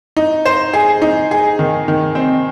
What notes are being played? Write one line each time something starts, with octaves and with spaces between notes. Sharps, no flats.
D#4
C5
G#4
D#4
G#4
D#3
D#3
C4